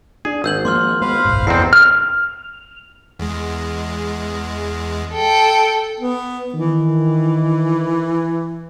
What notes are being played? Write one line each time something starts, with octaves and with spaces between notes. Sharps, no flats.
D4 G#4
G#1 E6 G6 F#7
F3 G#3 A#3 C6 D6 F6
G#3 B3 B4 C5 F5
F#1 B1 G#2
F1 E2 C4 D#4 A4 A5 C7
F6
E2 G#3
A4 G5
B3
D#3 E3